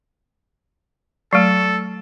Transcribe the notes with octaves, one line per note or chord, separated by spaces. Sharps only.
F#3 A3 A4